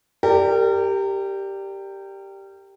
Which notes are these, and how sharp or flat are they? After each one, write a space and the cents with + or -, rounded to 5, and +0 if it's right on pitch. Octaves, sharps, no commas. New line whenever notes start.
G4 +0 A#4 -30 D5 +0